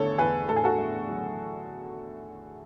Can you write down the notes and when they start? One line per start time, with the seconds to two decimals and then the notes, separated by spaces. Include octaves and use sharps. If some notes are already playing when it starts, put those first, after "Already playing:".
Already playing: E2 D3 A3 A4 C#5
0.18 E2 G#4 B4
0.48 A2 A4
0.56 G#4
0.64 F#4 A4
0.78 A3
1.09 F#3